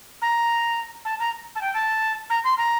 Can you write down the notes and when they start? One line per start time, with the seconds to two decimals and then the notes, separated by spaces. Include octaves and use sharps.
0.22 A#5
1.05 A5
1.20 A#5
1.55 A5
1.61 G5
1.74 A5
2.30 A#5
2.44 C6
2.57 A#5